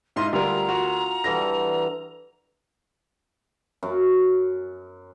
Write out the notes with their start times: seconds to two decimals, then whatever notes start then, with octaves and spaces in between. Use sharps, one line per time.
0.16 G#2 E4 F4 C5 D#5 F5 C6
0.33 D2 G3 A#4 A#5
0.69 F#4
1.24 D3 E3 G3 A#6
3.83 F#2